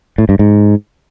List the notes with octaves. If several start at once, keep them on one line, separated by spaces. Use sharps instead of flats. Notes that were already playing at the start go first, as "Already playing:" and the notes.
A2
G2
G#2